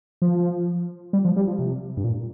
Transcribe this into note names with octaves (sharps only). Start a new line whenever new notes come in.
F3
G3
F3
G3
F3
C3
G2
A#2